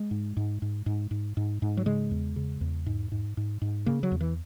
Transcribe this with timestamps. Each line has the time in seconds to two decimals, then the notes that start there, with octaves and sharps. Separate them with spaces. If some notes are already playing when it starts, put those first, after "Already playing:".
Already playing: G#3
0.11 G#2
0.37 G#2
0.62 G#2
0.86 G#2
1.11 G#2
1.37 G#2
1.62 G#2
1.77 F#3
1.86 C#3 G#3
2.11 E2
2.36 C#3
2.61 E2
2.86 G#2
3.12 G#2
3.37 G#2
3.62 G#2
3.86 C#3 A#3
4.03 F#3
4.11 E2
4.21 E3